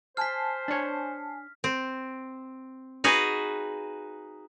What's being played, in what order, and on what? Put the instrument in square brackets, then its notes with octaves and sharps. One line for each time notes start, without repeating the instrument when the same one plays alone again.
[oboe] C5 [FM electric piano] G#5 A5 C7 [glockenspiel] F6 B6
[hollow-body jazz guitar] D4 C#5
[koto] C4
D#4 F#4 G#4 B4